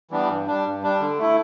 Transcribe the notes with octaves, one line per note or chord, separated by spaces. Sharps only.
E3 G3 B3 D4
G2
G3 D4
G2
G3 D4
D3
A3 E4